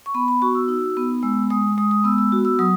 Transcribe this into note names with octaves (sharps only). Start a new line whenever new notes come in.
C#6
B3 B5
B5
F#4 C#6
E6
D#4 E6
B3
G#3 E6
G#3 D#6
G#3 D#6
D#6
B3 E6
E6
F#4
E6
F#3 D#6